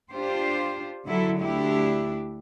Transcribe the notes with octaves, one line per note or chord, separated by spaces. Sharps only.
D4 F4 G4 C5
D3 F#3 E4 A4
D2 D4 E4 G4